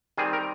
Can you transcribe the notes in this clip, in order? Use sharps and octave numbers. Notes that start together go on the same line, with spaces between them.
D#3 G3 C4 G#4
A#4